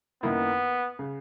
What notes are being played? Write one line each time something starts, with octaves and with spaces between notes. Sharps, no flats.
F#2 D#3 A#3 B3 E4
C#3